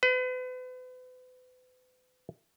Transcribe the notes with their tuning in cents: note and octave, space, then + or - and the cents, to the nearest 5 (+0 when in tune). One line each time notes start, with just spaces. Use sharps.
B4 +40